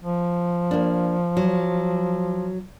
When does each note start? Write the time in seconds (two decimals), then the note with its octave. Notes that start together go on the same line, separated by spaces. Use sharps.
0.01 F3
0.71 A#3 D4
1.37 F#3